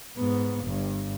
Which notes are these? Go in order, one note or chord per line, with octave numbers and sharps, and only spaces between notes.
G#2 B3
G1 G2